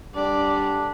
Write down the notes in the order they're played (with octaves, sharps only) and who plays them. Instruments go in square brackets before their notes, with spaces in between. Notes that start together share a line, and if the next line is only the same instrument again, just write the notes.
[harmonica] D3 G3 [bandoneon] D4 [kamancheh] D5